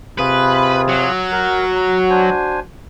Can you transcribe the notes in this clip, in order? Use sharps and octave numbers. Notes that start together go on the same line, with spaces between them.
C3 F4 G#4 B4
F#3
F#4 A#4
A#5
D4 C5 G#5